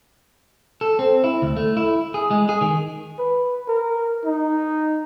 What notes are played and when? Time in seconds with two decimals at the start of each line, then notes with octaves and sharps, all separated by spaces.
0.81 A4
0.99 C4
1.24 E4
1.42 D2
1.57 A3
1.77 E4
2.14 G#4
2.31 G#3
2.49 G#4
2.61 D#3
3.19 B4
3.68 A#4
4.25 D#4